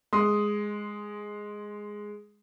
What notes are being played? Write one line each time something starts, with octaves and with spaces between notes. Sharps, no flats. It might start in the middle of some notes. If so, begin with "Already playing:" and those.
G#3 C6 D#6